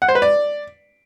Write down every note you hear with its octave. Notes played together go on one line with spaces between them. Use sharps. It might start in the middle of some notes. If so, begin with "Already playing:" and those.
F#5
C5
B4
D5